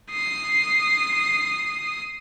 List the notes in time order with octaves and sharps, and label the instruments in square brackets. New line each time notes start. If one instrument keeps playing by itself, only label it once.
[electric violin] D#6 C7